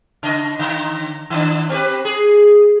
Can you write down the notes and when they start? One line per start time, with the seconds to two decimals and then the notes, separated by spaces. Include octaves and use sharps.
0.23 C#3 D#5
0.59 D3
1.30 D#3 D4
1.69 C4 G4 B4
2.05 G#4